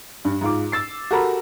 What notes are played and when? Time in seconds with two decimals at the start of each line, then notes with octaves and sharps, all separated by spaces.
0.25 G2
0.41 G#2 F4 D6
0.72 E6 A6 C7
1.11 F#4 G4 A4 A#4 A#5 B5